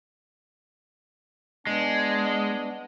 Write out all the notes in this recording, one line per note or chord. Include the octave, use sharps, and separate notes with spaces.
G#3 B3 D4